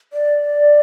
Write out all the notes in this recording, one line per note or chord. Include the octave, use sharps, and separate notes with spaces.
D5